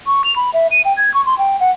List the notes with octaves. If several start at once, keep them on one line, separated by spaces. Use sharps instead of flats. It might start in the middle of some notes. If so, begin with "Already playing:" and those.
C#6
F7
B5
E5
D#7
G5
G#6
C#6
C6
G5
F#5